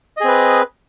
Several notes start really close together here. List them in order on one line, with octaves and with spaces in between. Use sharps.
D#5 G#4 C4 B4